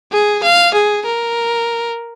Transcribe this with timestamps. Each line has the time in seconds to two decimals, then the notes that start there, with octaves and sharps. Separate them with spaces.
0.12 G#4
0.43 F5
0.74 G#4
1.05 A#4